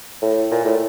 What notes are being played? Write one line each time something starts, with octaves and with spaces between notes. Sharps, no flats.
A2
A#2
A2